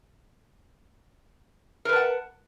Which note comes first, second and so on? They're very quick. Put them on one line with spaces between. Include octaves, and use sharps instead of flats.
A#4 B4 A5 F#5